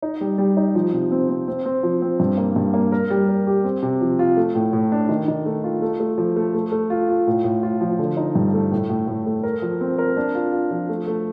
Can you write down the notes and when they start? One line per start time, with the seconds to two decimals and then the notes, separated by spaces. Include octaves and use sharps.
0.02 D#4
0.21 G3
0.38 G3
0.57 D#4
0.75 F3
0.93 C3
1.11 C4
1.29 C4
1.48 C4
1.66 C4
1.83 F3
2.02 C4
2.20 G2
2.38 A#3
2.56 G2
2.74 A#3
2.92 A#4
3.10 G3
3.29 A#4
3.47 G4
3.64 C4
3.83 C3
4.01 F3
4.19 F4
4.37 A3
4.55 A2
4.73 A2
4.92 D4
5.09 D#3
5.28 D#3
5.46 A3
5.64 F4
5.82 A3
6.00 A3
6.18 F3
6.36 A3
6.54 A3
6.72 A3
6.90 F4
7.09 F4
7.27 A2
7.44 A2
7.63 F4
7.81 F3
7.99 D3
8.17 D#4
8.35 G2
8.54 A3
8.72 A2
8.90 A2
9.07 A2
9.26 A3
9.43 A#4
9.62 F3
9.81 C4
9.98 A#4
10.17 D4
10.35 F4
10.52 F4
10.71 F3
10.89 A3
11.07 A3